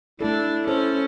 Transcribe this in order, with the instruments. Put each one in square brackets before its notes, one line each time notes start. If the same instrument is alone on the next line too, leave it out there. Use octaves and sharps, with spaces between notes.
[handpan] A3 A4 [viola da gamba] D4 [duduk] E4
[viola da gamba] C#4 [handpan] A4 C5